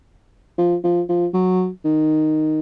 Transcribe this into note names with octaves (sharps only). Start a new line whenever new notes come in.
F3
F3
F3
F#3
D#3